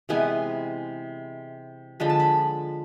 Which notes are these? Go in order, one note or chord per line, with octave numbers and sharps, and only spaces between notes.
C3 E3 G#3 B3 G#5
D3 F3 G#3 B5
A5
B5